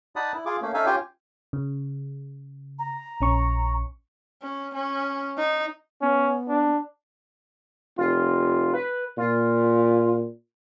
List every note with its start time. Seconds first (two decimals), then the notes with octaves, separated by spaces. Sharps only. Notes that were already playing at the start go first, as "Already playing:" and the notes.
0.16 D#4 D5 F#5 A5 B5 D#6
0.33 E4
0.45 F4 G#4 D6
0.61 A3 A#3 C#4
0.74 C#4 D#4 A4 E5 F5 G#5
0.86 C#4 F4 G4 G5 G#5
1.53 C#3
2.79 A#5
3.21 A#1 C#4 C#6
4.43 C#4
4.74 C#4
5.38 D#4
6.02 B3 C#4
6.49 D4
7.98 F1 F4
8.74 B4
9.18 A#2 F4